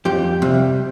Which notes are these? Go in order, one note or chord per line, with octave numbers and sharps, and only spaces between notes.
F2 G4
C3 G3